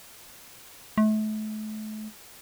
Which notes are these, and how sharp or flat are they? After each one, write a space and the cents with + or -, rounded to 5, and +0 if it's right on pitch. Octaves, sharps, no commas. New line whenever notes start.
A3 -35